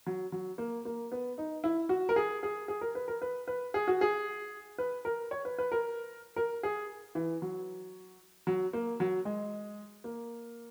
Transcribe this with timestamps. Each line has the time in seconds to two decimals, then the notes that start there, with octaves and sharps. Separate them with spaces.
0.06 F#3
0.32 F#3
0.58 A#3
0.85 A#3
1.12 B3
1.38 D#4
1.64 E4
1.89 F#4
2.09 A#4
2.16 G#4
2.43 G#4
2.68 G#4
2.81 A#4
2.95 B4
3.08 A#4
3.22 B4
3.48 B4
3.74 G#4
3.88 F#4
4.01 G#4
4.78 B4
5.05 A#4
5.31 C#5
5.45 B4
5.58 B4
5.72 A#4
6.36 A#4
6.63 G#4
7.15 E3
7.42 F#3
8.47 F#3
8.73 A#3
9.00 F#3
9.25 G#3
10.04 A#3